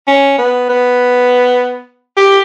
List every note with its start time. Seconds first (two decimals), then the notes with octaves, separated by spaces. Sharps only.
0.07 C#4
0.38 B3
0.69 B3
2.17 G4